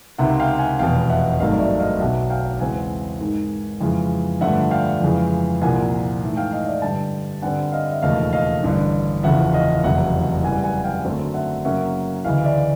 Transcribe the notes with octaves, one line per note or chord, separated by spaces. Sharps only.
C#2 C3 D#3 E5 F#5
F5 G5
F#5 G#5
F1 E2 B2 F5 G5
E5 F#5
G#1 G2 D#3 F#3 A3 D#5 F5
D5 E5
D#5 F5
B1 B2 F#3 E5 F#5
F5 G5
E2 C#3 E3 G#3 C4 F#5 G#5
G#2 D#3 G#3
F2 C#3 E3 G#3
G2 D3 F3 A3 E5 F#5
F5 G5
F2 C#3 E3 G#3
C2 A#2 F3 A#3 F#5 G#5
G#2 E3 A3
F5 G5
D#5 F5
D5 E5
G2 D3 G3 G5 A5
G2 D3 G3 C4 F#5 G#5
D#5 F5
E5
E1 D#2 C#3 F3 A3 D#5 F5
D#5 F5
A1 G2 D3
F#1 E2 C#3 F3 E5 F#5
D#5 F5
F1 E2 C#3 F#3 E5 F#5
F#2 C#3 E3 G3 F#5 G#5
F#5 G#5
F5 G5
F#2 D3 F#3 A3 C4
E5 F#5
F#2 C#3 F#3 A#3 C#4 E5 F#5
D2 C#3 E3 D#5 F5
D5 E5